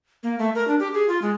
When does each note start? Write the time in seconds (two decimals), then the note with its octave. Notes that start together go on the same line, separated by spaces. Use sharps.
0.23 A#3
0.39 A3
0.55 A#4
0.68 D4
0.80 G4
0.94 G#4
1.09 F4
1.22 G#3